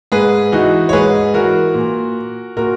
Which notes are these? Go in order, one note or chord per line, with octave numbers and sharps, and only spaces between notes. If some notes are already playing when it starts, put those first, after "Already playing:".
G#2 G#4 B4
E3 D#4 F#4
C#5
G#2 G#4 B4
E3 F#4 A#4
A#2
A#2 F#4 A#4